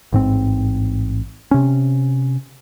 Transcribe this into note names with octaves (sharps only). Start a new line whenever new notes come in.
A1 G#2 C4
C3 C#4